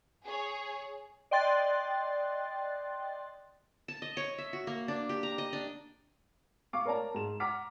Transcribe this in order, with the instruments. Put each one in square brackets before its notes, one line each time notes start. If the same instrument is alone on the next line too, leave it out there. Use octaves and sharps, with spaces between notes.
[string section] G#4 C#5
[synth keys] D5 D#5 G5 C6 F#6 A6
[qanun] A5
D#5
C#5
E5
F#4
A#3
D4
G4
A#5
D#5
D4
[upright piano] F5 C#6 D6
A#4 C#5 D5 A5 A#5
G#2 E7
F#5 A#5 D6 F6 B6